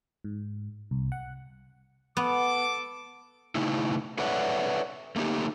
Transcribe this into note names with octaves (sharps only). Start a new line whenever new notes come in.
G#2
C2
F#5
B3 A4 D6
C#3 A3 D#4 E4
A4 B4 C#5 D5 E5 F#5
A3 A#3 D#4 G4